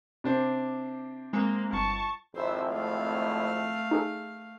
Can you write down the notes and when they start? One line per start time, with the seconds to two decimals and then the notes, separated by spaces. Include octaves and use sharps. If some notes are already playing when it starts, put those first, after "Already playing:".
0.24 C3 D4 C5
1.33 G#3 A#3 C4
1.73 G1 A5 C#6
2.35 G#1 F2 E4 C5 E5
2.71 A3 F5
3.91 D#4 G#4 A4